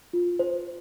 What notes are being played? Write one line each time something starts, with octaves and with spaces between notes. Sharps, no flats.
F4
C5